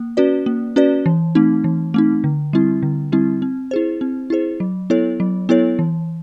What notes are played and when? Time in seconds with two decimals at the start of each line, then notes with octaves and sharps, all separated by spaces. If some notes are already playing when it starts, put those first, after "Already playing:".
Already playing: A#3
0.17 C#4 F#4 B4 D5
0.46 A#3
0.76 C#4 F#4 B4 D5
1.06 E3
1.35 A3 C4 D#4
1.64 E3
1.94 A3 C4 D#4
2.24 D3
2.53 G3 C4 E4
2.83 D3
3.12 G3 C4 E4
3.42 C4
3.71 E4 G#4 C5
4.01 C4
4.30 E4 G#4 C5
4.60 F#3
4.90 B3 E4 A4 C#5
5.20 F#3
5.49 B3 E4 A4 C#5
5.79 E3